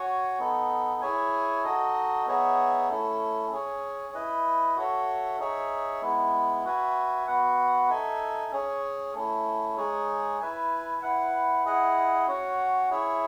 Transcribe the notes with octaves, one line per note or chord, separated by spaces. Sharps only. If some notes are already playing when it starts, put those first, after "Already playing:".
Already playing: F#4 C#5 G#5
B3 D#4 A4
E4 G#4 C#5 E5 G#5
D#4 F#4 A4 D#5
B3 D#4 G#4 C#5 E5
A3 C#4 E4 A4
C#4 G#4 C#5
E4 B4 D#5
F#4 A4 C#5 E5
D#4 G#4 C#5 E5
G#3 B3 E4
F#4 B4 E5 G#5
B3 F#4 B4 F#5
D#4 A4 E5 G#5
C#4 G#4 C#5
A3 C#4 E4
G#3 D#4 G#4 C#5
E4 B4 E5 G#5
E4 B4 F#5
E4 G#4 D#5 F#5
C#4 F#4 C#5 F#5
E4 G#4 C#5 E5